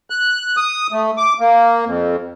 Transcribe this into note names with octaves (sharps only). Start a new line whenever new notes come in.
F#6
D#6
A3
D6
A#3
F2